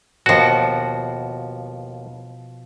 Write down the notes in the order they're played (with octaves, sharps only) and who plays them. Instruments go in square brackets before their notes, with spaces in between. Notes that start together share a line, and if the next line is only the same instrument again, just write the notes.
[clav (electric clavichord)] D#2 F#4 [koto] B2 F3